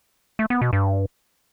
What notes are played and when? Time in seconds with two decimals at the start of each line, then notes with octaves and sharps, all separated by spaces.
0.39 A3
0.50 B3
0.61 B2
0.73 G2